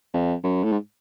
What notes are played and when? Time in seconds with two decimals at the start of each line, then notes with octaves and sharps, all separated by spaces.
0.14 F2
0.43 F#2
0.64 A2
0.72 G#2